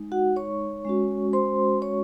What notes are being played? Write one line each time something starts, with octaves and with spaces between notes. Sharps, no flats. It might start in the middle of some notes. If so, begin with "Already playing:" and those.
Already playing: G#3 D#4
F#4 F#5
C#5 C#6
G#3 C#4 F#4
C5 C6
C#5 C#6